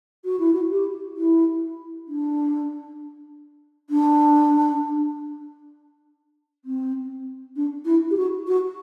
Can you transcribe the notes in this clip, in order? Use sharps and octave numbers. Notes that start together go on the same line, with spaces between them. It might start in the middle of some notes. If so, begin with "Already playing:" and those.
F#4
E4
F#4
G4
E4
D4
D4
C4
D4
E4
G4
F#4
F#4